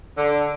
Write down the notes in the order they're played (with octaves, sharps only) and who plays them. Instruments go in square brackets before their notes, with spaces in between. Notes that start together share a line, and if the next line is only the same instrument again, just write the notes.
[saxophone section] D3